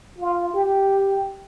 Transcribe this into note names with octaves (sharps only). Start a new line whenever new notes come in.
F4
G4